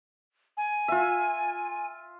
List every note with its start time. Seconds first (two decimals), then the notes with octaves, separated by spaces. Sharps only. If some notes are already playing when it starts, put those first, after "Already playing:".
0.57 G#5
0.88 F4 E5